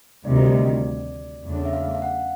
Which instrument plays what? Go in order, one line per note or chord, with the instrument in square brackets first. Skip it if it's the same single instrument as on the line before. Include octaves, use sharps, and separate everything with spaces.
[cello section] D2 C3 D#3 G3 [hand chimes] D5
[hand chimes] D#5
D5
[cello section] E2 C#3 F#3 A3 D4
[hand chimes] E5
F5
F5
F#5